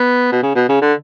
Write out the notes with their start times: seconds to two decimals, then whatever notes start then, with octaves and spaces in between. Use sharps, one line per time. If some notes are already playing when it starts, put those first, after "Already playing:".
Already playing: B3
0.32 B2
0.43 C#3
0.55 B2
0.69 C#3
0.82 D3